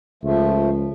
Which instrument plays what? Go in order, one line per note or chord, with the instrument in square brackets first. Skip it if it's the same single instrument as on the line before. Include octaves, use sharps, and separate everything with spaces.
[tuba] C#2 [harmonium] F3 A3